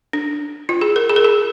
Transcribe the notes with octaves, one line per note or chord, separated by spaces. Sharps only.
D4
F4
G#4
A#4
G#4
A#4
G#4